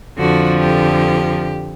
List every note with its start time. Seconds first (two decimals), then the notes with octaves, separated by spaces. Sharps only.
0.18 F2 D3 F3 F#4
0.60 G4